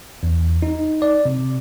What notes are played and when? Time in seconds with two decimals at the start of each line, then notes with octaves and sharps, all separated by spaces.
0.23 E2
0.62 D#4
1.02 D5
1.25 C3